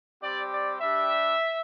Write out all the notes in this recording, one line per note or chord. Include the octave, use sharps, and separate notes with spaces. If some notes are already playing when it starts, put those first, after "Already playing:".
G3 C4 G4 D5
D5
G3 D4 G4 E5